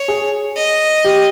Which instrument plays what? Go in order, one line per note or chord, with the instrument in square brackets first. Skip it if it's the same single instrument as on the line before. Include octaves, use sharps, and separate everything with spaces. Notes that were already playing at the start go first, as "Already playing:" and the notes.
Already playing: [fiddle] C#5
[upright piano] G#4
[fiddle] D#5
[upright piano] G4